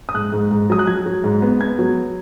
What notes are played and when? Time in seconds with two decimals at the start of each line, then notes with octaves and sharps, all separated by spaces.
0.09 D#6
0.14 G#2 F#6
0.32 G#2
0.51 G#2
0.70 F#3 D#6
0.79 F#6
0.87 F#3 G#6
1.06 F#3
1.24 G#2
1.42 B3
1.60 B3 G#6
1.79 F#3